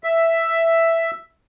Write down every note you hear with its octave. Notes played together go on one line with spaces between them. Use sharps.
E5